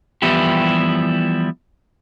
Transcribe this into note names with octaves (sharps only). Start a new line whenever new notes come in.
E3 F3 G3 B3 E4 G4